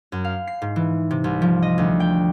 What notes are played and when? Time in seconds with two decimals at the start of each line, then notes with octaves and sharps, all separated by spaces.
0.12 F#2
0.24 F5
0.47 C7
0.62 G#2
0.76 E3
1.11 C3
1.24 C2
1.42 F3
1.62 D#5
1.78 D2
2.00 G5